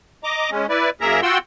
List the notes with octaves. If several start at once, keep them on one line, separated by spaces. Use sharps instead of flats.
D#5 A#5 D6
G#3 C#4
E4 B4 D5
F#2 A#3 G#4 A#4 E5 A#5
F4 F#4 F#5 G5 C6 E6